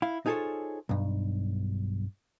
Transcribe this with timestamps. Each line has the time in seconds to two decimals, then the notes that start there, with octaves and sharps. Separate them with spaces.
0.02 E4 F5
0.26 D#4 F4 G#4 A4 C5 C#5
0.89 B1 G2